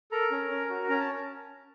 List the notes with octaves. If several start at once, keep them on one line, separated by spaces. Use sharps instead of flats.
A4 A#4 A#5
C#4
C#4
F#4
C#4 A#5
A5